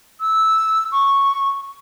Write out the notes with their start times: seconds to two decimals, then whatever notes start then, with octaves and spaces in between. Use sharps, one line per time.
0.21 E6
0.92 C#6